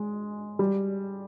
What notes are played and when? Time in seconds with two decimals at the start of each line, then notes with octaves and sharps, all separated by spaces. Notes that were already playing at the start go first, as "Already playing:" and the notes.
Already playing: G#3
0.59 G3